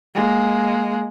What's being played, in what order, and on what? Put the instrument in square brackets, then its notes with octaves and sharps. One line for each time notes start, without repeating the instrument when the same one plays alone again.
[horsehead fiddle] G#3 A#3